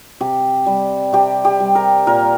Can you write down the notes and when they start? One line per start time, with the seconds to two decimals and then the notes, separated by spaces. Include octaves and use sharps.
0.20 C3 G4
0.66 G3
1.13 C3 G4
1.45 G4
1.60 G3
1.75 A#4
2.07 A#2 A#4